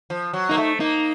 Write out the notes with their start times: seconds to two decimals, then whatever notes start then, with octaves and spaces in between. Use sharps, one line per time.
0.10 F3
0.33 F#3
0.49 A#3 D#4
0.57 A3
0.80 A#3 D#4